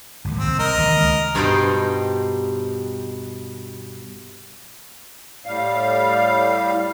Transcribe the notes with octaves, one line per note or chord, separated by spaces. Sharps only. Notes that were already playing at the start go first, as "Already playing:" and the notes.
G#1 D#2 D#3
C2 C4
A#4 D#5
D#2 D#3
C#2
G2 B2 G3 D#4 C5 G5
A2 G3 F5